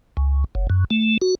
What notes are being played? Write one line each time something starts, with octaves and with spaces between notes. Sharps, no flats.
C#2
F#1
F#2
A3
F#4